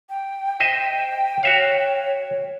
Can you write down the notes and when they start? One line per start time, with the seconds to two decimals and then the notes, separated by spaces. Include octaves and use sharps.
0.09 G5
0.60 C5 D#5 E5
1.43 F#4 C#5 E5 F5